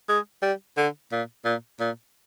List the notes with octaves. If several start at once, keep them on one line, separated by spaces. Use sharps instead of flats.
G#3
G3
D3
A#2
A#2
A#2